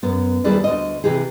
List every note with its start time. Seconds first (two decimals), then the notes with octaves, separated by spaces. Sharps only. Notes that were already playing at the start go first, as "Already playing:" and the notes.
0.03 F#2 B3
0.44 D#2 G3 E4 G#4 B4 D5
0.64 D2 D#5
1.04 C3 E3 G4 G#4